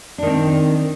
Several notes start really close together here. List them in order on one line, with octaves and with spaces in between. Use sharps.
D4 D#3 C4